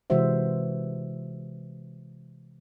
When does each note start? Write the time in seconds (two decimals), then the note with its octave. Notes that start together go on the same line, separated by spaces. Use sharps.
0.10 C3 E3 G#3 F#4 C5 E5